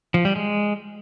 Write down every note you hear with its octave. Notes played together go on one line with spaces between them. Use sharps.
F3
G3
G#3